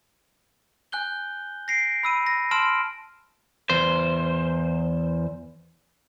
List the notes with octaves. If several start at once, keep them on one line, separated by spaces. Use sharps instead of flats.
G#5 F#6 G6 G7
A#6 C7 D7
B5 E6 D#7
A#6
A5 C6 E6 F6 D7 E7
E2 C5